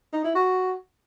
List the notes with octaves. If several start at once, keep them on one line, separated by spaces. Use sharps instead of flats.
D#4
E4
F#4